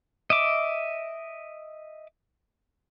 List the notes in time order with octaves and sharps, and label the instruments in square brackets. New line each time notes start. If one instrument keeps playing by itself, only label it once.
[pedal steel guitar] D#5 E5 D6